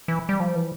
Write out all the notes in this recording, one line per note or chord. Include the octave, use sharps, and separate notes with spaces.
E3
G3
F3
E3